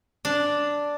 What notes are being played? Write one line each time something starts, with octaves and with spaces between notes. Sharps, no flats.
D4